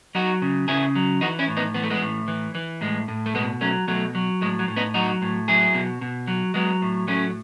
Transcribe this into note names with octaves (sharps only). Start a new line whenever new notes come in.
F#3 D#4 F#4
C#3
C#3 E4 G#4
F#3
E3 D#4 F#4
C#4 E4
A2
B3 D#4
E3 B3
A3
G#3 B3
A2
E3
E3
A2 G#3
A2
A3
B2 G#3 B3
F#3 A3 C#4
B2 F#3 A3
F#3
A2 G#3
F#3
A2
B3 D#4
F#3 D#4 F#4
A2
F#3 E4 G#4
B2
B2
F#3
F#3 G#3 B3
A2
F#3 A3 C#4